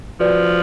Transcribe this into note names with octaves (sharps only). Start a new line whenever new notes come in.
F3 F#4 B4 D5